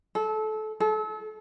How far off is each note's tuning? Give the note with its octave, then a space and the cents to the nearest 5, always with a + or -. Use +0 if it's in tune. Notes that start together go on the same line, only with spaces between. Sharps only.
A4 -25
A4 -35